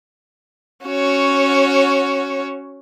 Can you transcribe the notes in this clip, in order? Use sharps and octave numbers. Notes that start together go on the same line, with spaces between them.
C#4 F#4 C#5